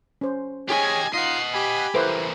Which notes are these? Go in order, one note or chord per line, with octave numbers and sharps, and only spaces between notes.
C#4 C5
G4 G#4 C#5 D#5 G#5
D#4 F4 D#5 F#5 C7
G4 G#5 B5
E3 A#3 E4 A4 B4 C5